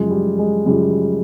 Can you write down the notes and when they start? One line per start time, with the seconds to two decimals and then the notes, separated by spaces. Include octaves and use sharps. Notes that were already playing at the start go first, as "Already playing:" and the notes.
Already playing: F#2 C#3 F3 G#3
0.11 G3
0.39 G#3
0.66 F#2 C#3 F3 G3